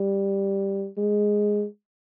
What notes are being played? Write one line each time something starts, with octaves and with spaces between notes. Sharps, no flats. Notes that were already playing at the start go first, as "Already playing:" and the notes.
Already playing: G3
G#3